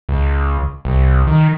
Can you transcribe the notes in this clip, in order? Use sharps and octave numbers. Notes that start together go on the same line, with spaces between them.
C#2
C2
D#3